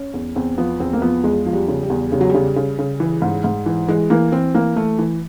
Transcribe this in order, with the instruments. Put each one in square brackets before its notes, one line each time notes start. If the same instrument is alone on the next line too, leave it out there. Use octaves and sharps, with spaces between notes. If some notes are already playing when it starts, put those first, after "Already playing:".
Already playing: [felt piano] C#4
E2
E2 C4
F3 B3
E2 C4
A#3
F3 B3
E2 G#3
F3
G3
C#3
G3
E2
C#3 G3
F#3
C#3 G3
C#3
C#3
E3
G#2
G#2
E3
E3 G#3
E3 A#3
E3 C4
E3 A#3
E3 A3
E3